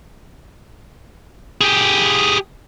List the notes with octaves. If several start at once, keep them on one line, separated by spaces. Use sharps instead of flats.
G4 G#4